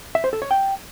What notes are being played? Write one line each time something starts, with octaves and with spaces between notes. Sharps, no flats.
E5
C5
A4
C#5
G5